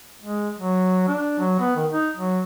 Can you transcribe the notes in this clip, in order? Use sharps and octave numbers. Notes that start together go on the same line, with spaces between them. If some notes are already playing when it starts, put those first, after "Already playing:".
G#3
F#3
D4
F#3
B3
D#3
D#4
F#3